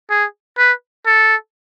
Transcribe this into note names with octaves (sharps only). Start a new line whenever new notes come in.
G#4
B4
A4